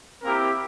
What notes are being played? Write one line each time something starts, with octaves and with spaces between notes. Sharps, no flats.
A#3 C4 E4 G4 A#4